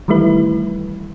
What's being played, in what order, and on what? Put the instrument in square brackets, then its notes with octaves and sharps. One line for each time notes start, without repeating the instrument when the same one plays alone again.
[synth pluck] D#3 E3 G3 A3 E4 B4